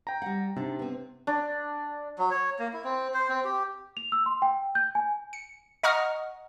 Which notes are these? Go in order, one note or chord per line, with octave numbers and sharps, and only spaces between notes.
G5 A#5
G3 F#5
C3 D4 D#4
B3 C4
D4
F#3
C#5
A#3
E4
C4
C5
C4
G4
F7
E6
C6
G5
G6
G#5
C#7
D#5 F#5 A#5 C#6 D#6 F6